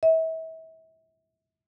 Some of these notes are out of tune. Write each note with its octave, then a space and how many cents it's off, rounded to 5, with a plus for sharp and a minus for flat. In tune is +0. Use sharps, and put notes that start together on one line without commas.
E5 -35